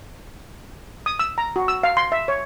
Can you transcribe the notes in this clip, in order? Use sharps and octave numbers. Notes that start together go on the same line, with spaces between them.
D#6
E6
A#5
F#4
E6
F5
C6
E5
C#5